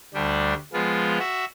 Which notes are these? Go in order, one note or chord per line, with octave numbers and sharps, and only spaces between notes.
D2 G3 D4
F3 G#3 B3 F4
F#4 E5